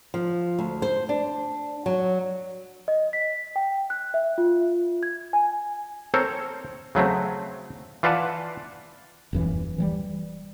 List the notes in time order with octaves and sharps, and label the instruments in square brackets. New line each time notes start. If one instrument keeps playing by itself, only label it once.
[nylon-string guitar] F3
D2
C5
D4
F#3
[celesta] D#5
B6
G5
F#6
E5
F4
G#6
G#5
[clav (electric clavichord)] C4 A4 A#4 C5 C#5
C#3 F#3 A3 C4
E3 F4 B4 D5 F#5 A5
[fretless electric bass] D#1 F#2 E3
E3 F#3 G3